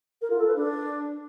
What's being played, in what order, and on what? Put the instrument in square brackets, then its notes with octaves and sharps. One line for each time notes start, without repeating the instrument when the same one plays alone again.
[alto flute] A#4
F4
A4
B4
D4